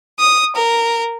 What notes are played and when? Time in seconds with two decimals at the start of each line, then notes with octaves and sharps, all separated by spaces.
0.19 D#6
0.56 A#4